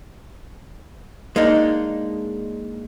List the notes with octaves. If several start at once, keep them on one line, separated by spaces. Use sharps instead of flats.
G#3 A#3 D4 D#4